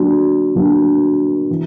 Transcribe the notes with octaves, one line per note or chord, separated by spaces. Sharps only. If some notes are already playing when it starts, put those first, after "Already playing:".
Already playing: D3 F#3 A#3 D4
D3 F#3 A#3 D4
E3